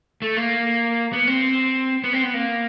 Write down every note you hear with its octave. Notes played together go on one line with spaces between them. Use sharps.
A3
A#3
B3
C4
B3
C4
B3
A#3